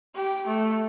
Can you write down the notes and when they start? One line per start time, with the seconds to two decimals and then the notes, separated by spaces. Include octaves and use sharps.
0.15 G4
0.47 A3